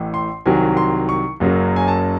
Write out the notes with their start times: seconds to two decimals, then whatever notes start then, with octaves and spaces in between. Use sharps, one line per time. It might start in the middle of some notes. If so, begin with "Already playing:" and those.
Already playing: A1 A2 E3
0.14 C6
0.46 C2 C3 D#3 F#3 G#5
0.77 C6
1.09 C#6
1.40 F#1 F#2 C#3 F#3
1.76 G#5
1.88 A5